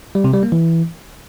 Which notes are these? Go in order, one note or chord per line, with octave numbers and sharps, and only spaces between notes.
G3
C3
G3
A#3
E3